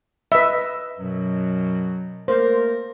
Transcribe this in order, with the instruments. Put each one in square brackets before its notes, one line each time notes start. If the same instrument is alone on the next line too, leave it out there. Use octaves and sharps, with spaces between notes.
[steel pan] B4 D#5 E5
[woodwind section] F#2 B2 F#3
[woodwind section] A3 A#3 A#4 [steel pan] C5